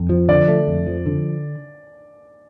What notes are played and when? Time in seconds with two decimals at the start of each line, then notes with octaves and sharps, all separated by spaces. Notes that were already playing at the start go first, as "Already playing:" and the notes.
Already playing: F2
0.09 F3
0.29 D3 D5
0.48 A3
0.68 F2
0.87 F3
1.06 D3